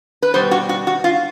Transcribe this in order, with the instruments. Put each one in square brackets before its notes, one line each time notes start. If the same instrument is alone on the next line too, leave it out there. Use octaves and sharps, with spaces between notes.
[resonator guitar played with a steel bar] B4
B2 G3 C5
F#4
F#4
F#4
F4